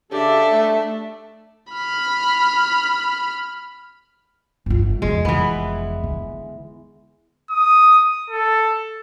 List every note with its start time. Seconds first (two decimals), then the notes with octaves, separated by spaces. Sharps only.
0.12 C#3 D4 G4 A4 E5
0.52 A3
1.73 B5 F6
4.66 G1 F4
5.02 B1 E2 G#3
5.25 F1 F2 E3 B3
6.04 D3
7.51 D#6
8.30 A4